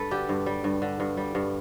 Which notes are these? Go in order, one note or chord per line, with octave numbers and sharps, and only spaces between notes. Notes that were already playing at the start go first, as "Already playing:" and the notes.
Already playing: G2 A4 B4
D3 G4
G2
G3
G2
D3
G2
G3
G2